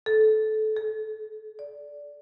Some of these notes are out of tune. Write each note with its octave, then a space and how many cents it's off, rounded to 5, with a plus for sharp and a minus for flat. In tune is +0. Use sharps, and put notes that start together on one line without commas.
A4 -20
G#4 +45
D5 -10